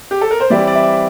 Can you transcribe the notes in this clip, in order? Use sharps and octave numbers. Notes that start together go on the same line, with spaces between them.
G4
A4
A#4
C5
E3 G3 C4 E4 D5
D5
E5